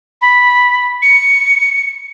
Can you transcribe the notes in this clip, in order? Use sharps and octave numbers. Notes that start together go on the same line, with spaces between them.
B5
C#7